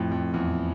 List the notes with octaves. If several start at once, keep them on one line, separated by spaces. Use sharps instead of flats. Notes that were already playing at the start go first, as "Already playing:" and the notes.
Already playing: F2 A2
F2
E2